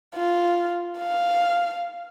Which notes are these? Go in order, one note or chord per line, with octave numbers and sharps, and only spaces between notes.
F4
F5